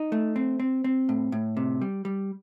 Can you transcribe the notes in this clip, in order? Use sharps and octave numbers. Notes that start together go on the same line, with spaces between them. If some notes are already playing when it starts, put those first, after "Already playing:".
Already playing: D#4
A3
C4
C4
C4
A2
A2
C3
G3
G3